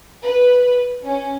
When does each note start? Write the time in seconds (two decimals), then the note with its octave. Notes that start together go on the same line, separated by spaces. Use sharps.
0.23 B4
1.04 C#4